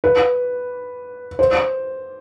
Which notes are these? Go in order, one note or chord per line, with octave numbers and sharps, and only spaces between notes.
B4
C5